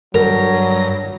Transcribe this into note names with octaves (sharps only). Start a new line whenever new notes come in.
G2 F#3 A#4 A#6